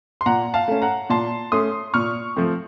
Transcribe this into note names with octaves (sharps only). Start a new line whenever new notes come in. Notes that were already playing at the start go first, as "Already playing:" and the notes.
C6
A#2 F#5 A#5
F5 A5
A3 C#4
F#5 A#5
A#2 A5 C6
A3 C#4 C6 D#6
A#2 C#6 F6
F3 A3 C4